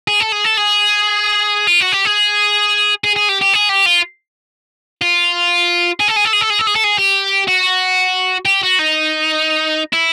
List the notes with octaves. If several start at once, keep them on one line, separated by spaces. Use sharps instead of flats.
G#4
A4
G#4
A4
G#4
F4
F#4
G4
G#4
G#4
G#4
G4
G4
G#4
G4
F4
F4
G#4
A4
G#4
A4
G#4
A4
G#4
A4
G#4
A4
G#4
G4
F#4
G4
F#4
D#4
E4